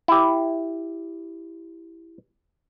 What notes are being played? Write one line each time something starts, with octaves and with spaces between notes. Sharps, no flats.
E4 G4